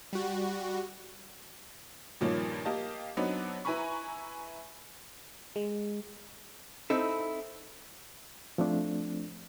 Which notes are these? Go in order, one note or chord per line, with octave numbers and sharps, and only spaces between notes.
G3 F#4
G2 A#2 D#3 F3 A#3 C#4
A#3 G4 D#5 F5 A5
F#3 B3 C4 D4 D#4 B4
E4 B4 G#5 A#5 B5 C#6
G#3
C4 D#4 E4 A4
F3 A3 C4 D4